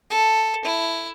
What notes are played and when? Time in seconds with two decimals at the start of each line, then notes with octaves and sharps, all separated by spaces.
0.10 A4
0.65 E4